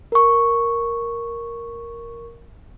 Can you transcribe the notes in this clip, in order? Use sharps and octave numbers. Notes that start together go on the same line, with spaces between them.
A#4 C#6